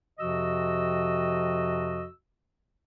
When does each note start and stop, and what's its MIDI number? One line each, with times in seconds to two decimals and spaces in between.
0.19 2.05 41
0.19 2.05 48
0.19 2.05 53
0.19 2.05 66
0.19 2.05 75
0.19 2.05 88